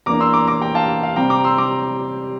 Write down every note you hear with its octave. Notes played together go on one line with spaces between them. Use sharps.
E2 E3 A#3 D4 A#5 D6
C6 E6
A#5 D6
A#5 D6
G5 A#5
F5 A5
F5
C3 G3 C4 G5 A#5
A#5 D6
C6 E6
A#5 D6